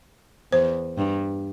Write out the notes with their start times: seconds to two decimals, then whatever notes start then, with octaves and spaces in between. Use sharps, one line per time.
0.52 E2 C5
0.98 G2